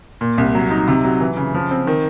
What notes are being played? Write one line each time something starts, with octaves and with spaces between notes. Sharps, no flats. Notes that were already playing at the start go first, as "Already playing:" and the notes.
A#2
C2
F#3
D#4
C3
F#3
E3
C#3
F3
C4
D#3